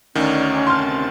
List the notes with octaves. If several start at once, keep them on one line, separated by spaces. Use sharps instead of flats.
D2 D#3 C#4 D#4 D5 F6
C3 A5 C6 F6 A6